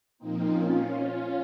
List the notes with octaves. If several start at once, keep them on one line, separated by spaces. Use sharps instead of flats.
A#2 F3 A#3 C4 D#4
C#4 F4